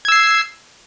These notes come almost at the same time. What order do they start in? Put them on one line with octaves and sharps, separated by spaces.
G#6 E6 C7